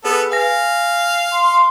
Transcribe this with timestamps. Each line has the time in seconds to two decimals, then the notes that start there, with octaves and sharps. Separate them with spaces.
0.05 B3 G#4 A4 B4
0.32 F5 G#5 A#6
1.31 C6